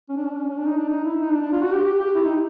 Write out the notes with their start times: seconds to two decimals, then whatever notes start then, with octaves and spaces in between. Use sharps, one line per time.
0.09 C#4
0.17 D4
0.24 C#4
0.31 D4
0.39 C#4
0.49 C#4
0.57 D4
0.67 D#4
0.78 D4
0.89 D#4
1.04 E4
1.21 D#4
1.31 D4
1.42 D4
1.52 F4
1.62 F#4
1.73 G4
1.84 G4
1.99 G4
2.15 E4
2.25 D#4